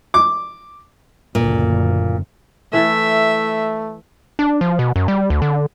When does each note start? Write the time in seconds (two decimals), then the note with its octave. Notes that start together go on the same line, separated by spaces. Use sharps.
0.14 D6
1.35 F#1 D2 A#2
2.73 E3 A3 E4 A4 E5
4.39 D4
4.61 F3
4.79 B2
4.96 F#2
5.08 G3
5.30 D2
5.42 D3